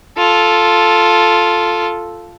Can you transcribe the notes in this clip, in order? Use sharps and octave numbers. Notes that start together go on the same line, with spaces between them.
F4 A4